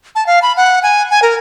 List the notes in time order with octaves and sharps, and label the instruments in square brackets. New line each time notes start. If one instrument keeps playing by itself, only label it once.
[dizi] A5
F5
B5
F#5
G#5
G#5
A#4